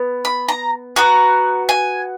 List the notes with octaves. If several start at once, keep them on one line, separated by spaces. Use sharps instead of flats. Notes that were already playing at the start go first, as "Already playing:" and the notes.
Already playing: B3
B5
A#5
B3 F#4 A#5
G#5